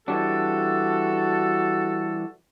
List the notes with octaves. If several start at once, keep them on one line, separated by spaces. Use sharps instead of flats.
E3 G3 D4 F#4 A4